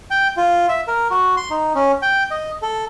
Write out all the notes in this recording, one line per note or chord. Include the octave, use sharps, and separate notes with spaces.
G5
F4
E5
A#4
F#4
C6
D#4
C#4
G5
D#5
A4